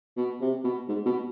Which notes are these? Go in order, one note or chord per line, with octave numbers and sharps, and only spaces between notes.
B2
C3
B2
G#2
B2